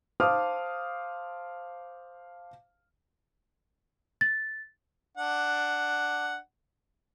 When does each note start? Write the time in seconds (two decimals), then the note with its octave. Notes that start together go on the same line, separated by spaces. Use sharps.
0.20 C5 F5 A5 D6 D#6 F6
4.21 A6
5.17 D4 F#5